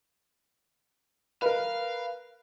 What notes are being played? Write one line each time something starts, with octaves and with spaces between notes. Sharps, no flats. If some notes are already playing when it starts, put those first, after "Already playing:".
A#4 B4 F5